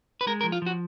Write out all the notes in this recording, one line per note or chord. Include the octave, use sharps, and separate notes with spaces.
B4
G#3 A#4
A#4
F3
F4
F3 F#4